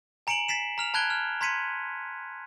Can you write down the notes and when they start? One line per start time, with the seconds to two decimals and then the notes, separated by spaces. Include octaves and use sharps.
0.27 G#5 A#5 C#7 D7 E7 F#7
0.49 A6 B6 C7 E7
0.78 A#5 F6 F7
0.94 A5 B5 F#6 G#6 D7 G7
1.10 F6
1.41 A#5 C6 G#6 B6 C#7 D#7